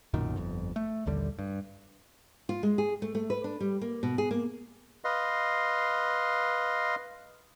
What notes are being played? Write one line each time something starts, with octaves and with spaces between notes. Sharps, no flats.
B1 F#2 A#2 D#3
G1 F2
A3
A#1 D#2 D3 G3
G2
F4
G#3
G#4
A3
A3
B4
D4
G3
A#3
B2
G#4
A#3
B4 D#5 F5 C6